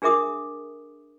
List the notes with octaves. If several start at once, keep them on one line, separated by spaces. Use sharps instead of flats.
D4 G#4 A#4 E5 D6 D#6